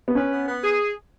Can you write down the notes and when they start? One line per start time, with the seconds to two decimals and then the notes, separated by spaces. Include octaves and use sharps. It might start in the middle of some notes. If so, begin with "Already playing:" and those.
0.08 B3
0.15 C#4 B4
0.32 B3
0.48 B3
0.63 G#4